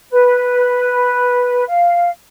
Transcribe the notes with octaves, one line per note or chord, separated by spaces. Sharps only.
B4
F5